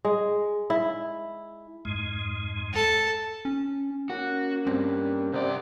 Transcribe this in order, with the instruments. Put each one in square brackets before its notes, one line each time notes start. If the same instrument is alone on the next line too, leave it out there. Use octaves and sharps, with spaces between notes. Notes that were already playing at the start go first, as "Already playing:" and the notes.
[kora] G#3
E4
[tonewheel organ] F2 G#2 G#3
[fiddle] A4 A5
[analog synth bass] C#4
[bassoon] A#3 [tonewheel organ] C#4 [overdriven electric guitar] F#4
[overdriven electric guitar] G2 [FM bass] C4
[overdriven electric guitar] C2 D5 [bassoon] C3 [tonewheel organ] C5 F#5 G5